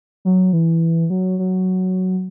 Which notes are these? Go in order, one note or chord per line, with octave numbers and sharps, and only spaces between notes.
F#3
E3
F#3
F#3